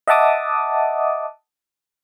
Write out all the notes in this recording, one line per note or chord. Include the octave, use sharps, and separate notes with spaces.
D#5 E5 F#5 A5 D6 D#6